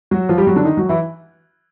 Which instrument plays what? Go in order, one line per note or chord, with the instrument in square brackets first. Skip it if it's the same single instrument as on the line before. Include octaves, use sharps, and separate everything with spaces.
[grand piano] F#3 F#4
F3 F4
G3 G4
F#3 F#4
D3 D4
D#3 D#4
F#3 F#4
E3 E4